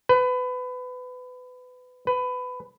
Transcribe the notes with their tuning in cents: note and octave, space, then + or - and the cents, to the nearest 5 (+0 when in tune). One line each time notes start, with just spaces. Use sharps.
B4 +25
B4 +20